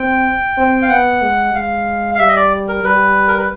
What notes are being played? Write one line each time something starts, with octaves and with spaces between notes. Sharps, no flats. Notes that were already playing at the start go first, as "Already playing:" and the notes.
Already playing: C4 G5
C4
F5
B3 F#5
G#3
G#3 F5
F5
G3 E5
D#5
D5
A#4
G3 B4
A#4
B4